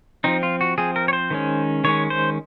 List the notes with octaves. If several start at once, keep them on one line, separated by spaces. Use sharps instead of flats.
F3 C4 D#4
F4
F#4
F3 C4 G#4
A#4
C#5
C5
D#3 G#3 C#4
D#3 G#3 C#4 C#5
C5